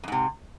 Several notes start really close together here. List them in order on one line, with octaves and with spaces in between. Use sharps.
F2 G#2 C3